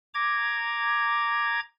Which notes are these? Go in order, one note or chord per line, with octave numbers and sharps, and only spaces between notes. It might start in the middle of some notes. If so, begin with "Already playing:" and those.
A#5 D6 G#6